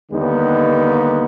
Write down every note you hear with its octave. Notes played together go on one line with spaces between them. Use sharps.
D#2 D3 G3 B3 D#4